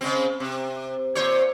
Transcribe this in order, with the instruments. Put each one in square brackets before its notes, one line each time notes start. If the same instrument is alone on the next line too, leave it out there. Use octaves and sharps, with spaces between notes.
[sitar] C#3 G#3 C4
C3
A#2 C5 C#5